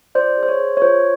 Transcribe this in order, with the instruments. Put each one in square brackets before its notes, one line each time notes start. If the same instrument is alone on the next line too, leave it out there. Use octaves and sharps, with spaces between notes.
[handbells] F4 C5 D5
G#4
C5
C#5
G#4
C#5
F4 C5